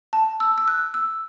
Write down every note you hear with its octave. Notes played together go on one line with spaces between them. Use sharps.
A5
E6
E6
F#6
E6